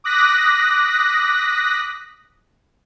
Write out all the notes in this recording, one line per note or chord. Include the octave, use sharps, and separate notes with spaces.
D6 D#6 F#6 A#6 B6